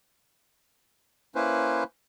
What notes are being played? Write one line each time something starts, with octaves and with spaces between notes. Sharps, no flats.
A#3 C#4 E4 B4 C5